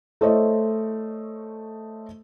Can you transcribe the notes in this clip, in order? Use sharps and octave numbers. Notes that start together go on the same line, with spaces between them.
A3 A4 C5 C#5 D#5 E5